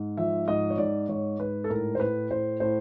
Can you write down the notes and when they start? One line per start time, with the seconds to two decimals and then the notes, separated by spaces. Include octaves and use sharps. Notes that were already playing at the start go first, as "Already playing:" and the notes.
Already playing: G#2
0.17 F3 E5
0.48 G#2 D#5
0.70 C#5
0.78 G#2 D5
1.09 G#2 C#5
1.39 G#2 B4
1.64 A4
1.70 A2 A#4
1.95 C5
2.00 A2 B4
2.30 A2 C5
2.60 A2 C5